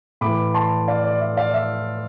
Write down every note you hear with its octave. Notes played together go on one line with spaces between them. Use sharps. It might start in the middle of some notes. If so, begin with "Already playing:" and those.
A2 E3 B5 D6
A5 C6
D5 F5
D5
E5
D5 F5
E5